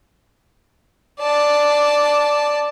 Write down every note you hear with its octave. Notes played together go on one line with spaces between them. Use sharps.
D5 A5